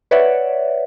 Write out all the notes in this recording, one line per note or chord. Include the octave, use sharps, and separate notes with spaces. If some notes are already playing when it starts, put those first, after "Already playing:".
B4 C#5 D5 E5 F#5